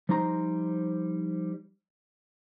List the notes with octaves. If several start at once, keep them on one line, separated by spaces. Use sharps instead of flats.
F3 G3 D#4 C5 A#5 C6